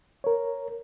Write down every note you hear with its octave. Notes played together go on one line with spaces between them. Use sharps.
A#4 C#5